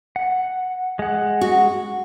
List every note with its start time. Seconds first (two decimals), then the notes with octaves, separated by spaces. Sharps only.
0.16 F#5
0.99 G#3 F#5
1.41 F#4